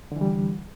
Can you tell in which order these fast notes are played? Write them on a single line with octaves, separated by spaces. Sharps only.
D3 E3 G3